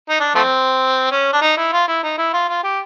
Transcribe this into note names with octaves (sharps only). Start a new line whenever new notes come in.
D#4
D4
F3 A3 C4
C#4
D4
D#4
E4
F4
E4
D#4
E4
F4
F4
G4